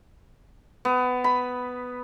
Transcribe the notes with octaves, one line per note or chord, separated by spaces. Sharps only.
B3
B5